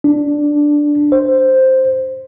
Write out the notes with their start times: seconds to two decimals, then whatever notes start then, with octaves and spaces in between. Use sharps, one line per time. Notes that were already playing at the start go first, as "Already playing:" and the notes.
0.04 D4
1.12 C5